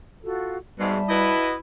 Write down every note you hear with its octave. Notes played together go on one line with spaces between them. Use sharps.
F4 F#4 A4
G#2 B2 G3 E5 A5
E4 F#4 B4 D#5